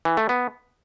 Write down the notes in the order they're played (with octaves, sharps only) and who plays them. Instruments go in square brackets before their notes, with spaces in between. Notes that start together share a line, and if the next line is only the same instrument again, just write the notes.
[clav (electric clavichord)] E3
A3
B3